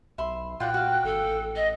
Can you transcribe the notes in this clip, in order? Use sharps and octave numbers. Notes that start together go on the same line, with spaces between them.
B1 E5 B5 C6
A#2 F4 F#4 D5 G5 F#6
F#4 F5
G#1 A4
A1
D#5